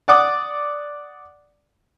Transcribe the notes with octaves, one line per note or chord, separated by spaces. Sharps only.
D5 F#5 D6 D#6